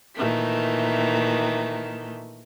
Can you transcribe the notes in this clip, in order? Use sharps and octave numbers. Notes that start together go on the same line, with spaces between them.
A#2 D#3 E3 A3